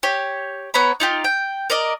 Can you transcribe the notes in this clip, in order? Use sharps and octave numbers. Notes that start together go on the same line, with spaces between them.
G4 C#5
B3 C#5 A#5 B5
D#4 F4 G4
G5
A#4 D5 D#5